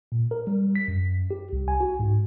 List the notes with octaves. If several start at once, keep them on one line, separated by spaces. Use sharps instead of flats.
A#2
A#4
G3
B6
F#2
G4
C2
G#5
F#4
G#2